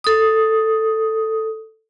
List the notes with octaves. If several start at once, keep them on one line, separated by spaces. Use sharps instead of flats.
A4 D#6